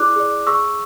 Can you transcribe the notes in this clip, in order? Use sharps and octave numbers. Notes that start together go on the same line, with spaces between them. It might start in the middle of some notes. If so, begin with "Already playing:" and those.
Already playing: E4 G#4 D5 D6 F#6
G#4 D5
G#4 C#6 E6